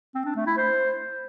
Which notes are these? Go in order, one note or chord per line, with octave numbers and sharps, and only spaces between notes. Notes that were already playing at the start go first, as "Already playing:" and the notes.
C4
D4
A3
E4
C5